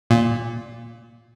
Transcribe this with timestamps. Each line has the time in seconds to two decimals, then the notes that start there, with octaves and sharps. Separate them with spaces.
0.10 A#2